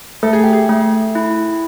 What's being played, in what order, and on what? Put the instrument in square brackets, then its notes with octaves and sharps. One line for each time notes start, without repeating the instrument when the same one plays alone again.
[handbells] A3 [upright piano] A4
[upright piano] G#4
G4
G#4
[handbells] A3
E4